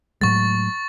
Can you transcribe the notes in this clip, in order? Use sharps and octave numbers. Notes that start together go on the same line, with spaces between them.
A2 F#3 G#3 C#6 A6